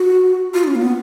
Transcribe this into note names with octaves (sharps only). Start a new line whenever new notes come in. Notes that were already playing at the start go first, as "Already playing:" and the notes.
Already playing: F#4
F4
D#4
C#4
A#3
B3